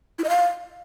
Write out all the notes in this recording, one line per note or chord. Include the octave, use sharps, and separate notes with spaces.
E4
D#5
F5